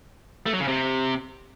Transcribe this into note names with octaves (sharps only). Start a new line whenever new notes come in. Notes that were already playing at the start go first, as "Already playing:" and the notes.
A3
F#3
C#3
C3